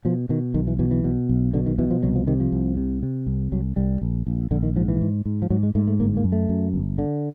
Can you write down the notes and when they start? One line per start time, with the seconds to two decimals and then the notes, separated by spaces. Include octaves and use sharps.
0.05 B2 F3
0.29 B2 D#3
0.54 B1 D#3
0.67 E3
0.79 B2 E3
0.91 E3
1.04 B2
1.29 B1
1.54 B2 D3
1.66 D#3
1.78 B2 E3
1.91 F3
2.03 C2 F#3
2.15 F3
2.27 C3 D#3
2.40 F3
2.52 C2
2.77 C3
3.03 C3
3.27 C2
3.52 C2 F#3
3.76 C2 G3
4.02 A#1
4.27 A#1
4.51 A#1 D3
4.63 D#3
4.76 G#2 F3
4.88 E3
5.01 G#2
5.26 G#2
5.42 F3
5.50 G#2 F#3
5.63 G#3
5.75 G#2 A3
5.87 A3
6.00 G1 A#3
6.17 A#3
6.24 F#2
6.32 A3
6.49 F#2
6.74 G1
6.98 D3